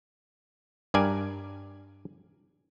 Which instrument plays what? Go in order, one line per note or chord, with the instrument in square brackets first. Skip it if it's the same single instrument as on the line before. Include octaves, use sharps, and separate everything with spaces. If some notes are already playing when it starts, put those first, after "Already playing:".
[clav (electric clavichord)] G2 A#4 D5 G#5